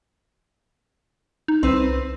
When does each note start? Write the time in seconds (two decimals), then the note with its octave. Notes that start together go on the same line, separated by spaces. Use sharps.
1.48 D#4
1.63 C2 C4 B4